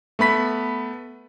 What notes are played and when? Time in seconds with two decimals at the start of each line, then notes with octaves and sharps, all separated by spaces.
0.19 A3 B3 B5 B6